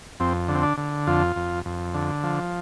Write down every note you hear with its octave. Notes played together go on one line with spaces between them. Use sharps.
F2 C4
D3
C4
D4
D3
F2 F4
F2
F2
D3
F3